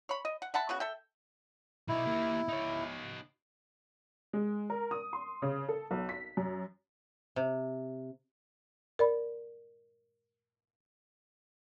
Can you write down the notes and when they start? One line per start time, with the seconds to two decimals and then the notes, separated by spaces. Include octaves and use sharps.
0.09 C#5 B5
0.25 D#5
0.42 F#5
0.54 E5 F#5 A5 B5
0.69 C#3 B3 F#4
0.80 A4 E5 G5
1.88 B2 D#4 E4
2.06 A#3 G4
2.49 D#4 C#5
4.33 G#3
4.70 A#4
4.91 D#6
5.13 C6
5.42 C#3
5.69 A4
5.91 B1
6.09 B6
6.37 F#2
7.36 C3
8.99 A#4 D5 B5